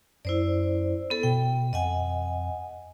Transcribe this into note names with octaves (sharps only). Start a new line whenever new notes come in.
F#2 E4 C5 D5
B3 A4
B2 G5
F2 D#5 F#5 G#5